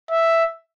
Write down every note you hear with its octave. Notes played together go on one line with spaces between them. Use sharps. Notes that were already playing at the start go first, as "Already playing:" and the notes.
E5